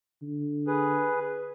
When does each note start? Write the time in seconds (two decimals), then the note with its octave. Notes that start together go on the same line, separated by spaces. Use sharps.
0.22 D3
0.67 G#4 B4